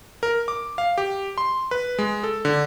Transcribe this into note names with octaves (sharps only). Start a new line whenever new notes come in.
A#4
D6
F5
G4
C6
B4
G#3
A4
D3